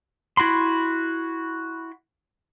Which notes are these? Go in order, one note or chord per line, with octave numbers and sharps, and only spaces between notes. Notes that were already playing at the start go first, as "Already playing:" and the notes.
E4 F#4 B5 C6